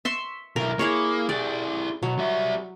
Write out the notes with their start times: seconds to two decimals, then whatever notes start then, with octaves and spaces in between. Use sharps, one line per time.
0.05 E5 C6 C#6
0.56 B1 E4 A#4
0.79 A#3 E4 G#4 C#5
1.29 E4 G4 D5
2.03 B2 F#3
2.18 G3 E5